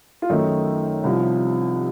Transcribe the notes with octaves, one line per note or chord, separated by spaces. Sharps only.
F4
F#2 D#3 A3 D#4
C2 C3 F3